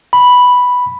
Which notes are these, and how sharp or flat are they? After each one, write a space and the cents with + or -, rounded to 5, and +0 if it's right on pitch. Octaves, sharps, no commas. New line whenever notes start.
B5 +0